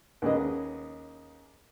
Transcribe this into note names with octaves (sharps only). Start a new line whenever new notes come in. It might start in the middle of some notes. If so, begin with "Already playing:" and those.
D#2 C#4 G#4 B4 D#5